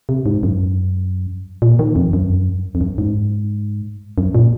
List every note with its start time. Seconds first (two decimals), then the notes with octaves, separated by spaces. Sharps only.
0.09 C3
0.26 G#2
0.43 F#2
1.62 A#2
1.79 D#3
1.96 F2
2.13 F#2
2.75 F2
2.81 F#2
2.98 G#2
4.18 F#2
4.35 A#2